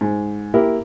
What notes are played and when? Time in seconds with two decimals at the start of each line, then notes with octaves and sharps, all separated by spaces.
0.01 G#2
0.54 A#3 E4 G4 A#4